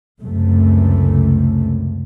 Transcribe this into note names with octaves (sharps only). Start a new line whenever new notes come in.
C#2 F#2 C3 A3